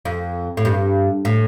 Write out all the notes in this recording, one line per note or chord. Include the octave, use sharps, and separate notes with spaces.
F2
A2
G2
A2